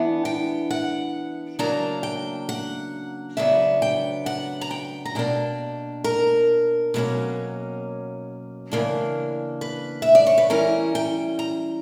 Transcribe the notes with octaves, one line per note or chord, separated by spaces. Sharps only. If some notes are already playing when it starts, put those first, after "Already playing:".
Already playing: E3 B3 D4
G5
F#5
C#3 F#3 A#3 D4 A#5
G5
F#5
C#3 F#3 B3 D4 E5
G5
F#5
A#5
G5
A#5
B2 A#3 D4 G5
A#4
B2 F#3 A#3 C#4
C#3 E3 A#3 D4
B4
E5
D5
C#5
B4
E3 G3 C#4 A#4
G5
A#5